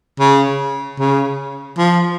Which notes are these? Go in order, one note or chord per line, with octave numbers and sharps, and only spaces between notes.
C#3
C#3
F3